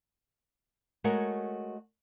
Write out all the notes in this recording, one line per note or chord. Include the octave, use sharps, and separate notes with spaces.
G#3 A3 F#4 A#4 C#5 F#5